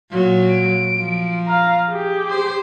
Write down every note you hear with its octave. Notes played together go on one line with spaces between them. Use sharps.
A#2 F#3
D7
F3
F5 A#5
G4 G#4
C5